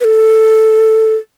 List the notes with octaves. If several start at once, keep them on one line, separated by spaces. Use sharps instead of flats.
B4
A4